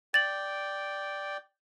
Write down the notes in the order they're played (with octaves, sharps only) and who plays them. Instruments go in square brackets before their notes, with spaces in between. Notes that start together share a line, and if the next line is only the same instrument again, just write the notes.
[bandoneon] D5 G5 [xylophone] A6 F#7